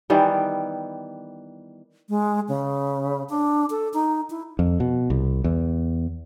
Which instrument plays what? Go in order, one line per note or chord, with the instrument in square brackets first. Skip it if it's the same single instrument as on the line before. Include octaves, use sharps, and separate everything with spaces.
[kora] D#3 E3 G3 B3
[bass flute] G#3
C#3
D4
A4
D#4
E4
[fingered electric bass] F2
B2
C2
E2